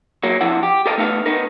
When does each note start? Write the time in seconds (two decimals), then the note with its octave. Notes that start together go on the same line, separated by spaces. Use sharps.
0.23 F#3 A#3
0.41 C3 F3 E4 F#5
0.63 G4
0.86 G4 A4 A#4 D#5 F5
0.98 A3 B3 D#4 F5
1.26 B3 D#4 A#4